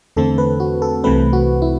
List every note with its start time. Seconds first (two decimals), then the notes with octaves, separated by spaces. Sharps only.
0.17 E2 D3 A3 C4 A4
0.38 B4
0.60 F#4
0.82 A4
1.04 C2 C3 E3 A3 C4 B4
1.33 F#4
1.62 E4